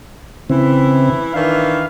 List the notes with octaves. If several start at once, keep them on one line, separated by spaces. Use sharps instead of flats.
C#3 E3 C4 E4
D#3 E3 D4 F5